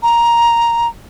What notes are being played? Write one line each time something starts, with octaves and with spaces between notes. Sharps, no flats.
A#5